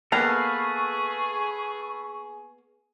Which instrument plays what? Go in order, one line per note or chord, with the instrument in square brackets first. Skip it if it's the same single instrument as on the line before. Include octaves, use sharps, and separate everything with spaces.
[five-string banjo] A#3 B3 A#5 [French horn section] G#4 [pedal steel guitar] A4 B4 F5 [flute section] C#6